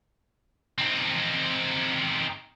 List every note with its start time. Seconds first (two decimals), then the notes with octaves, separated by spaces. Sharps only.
0.78 C4 D#4